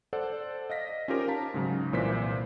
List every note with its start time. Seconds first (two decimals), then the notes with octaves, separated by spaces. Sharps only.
0.13 A4 C5 D5 F#5
0.70 D#5 F5 A#6 B6
1.08 C#4 D#4 F4 G4 A#4 C5
1.28 F5 A5 A#5 B6
1.54 G#2 C#3 F#3
1.93 C2 A#2 E3 C5 D5 B6